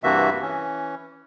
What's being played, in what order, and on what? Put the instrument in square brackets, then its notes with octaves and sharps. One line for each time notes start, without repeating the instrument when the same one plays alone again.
[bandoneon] G2 C3 E3 A#3 F#4 E5
E3 C#4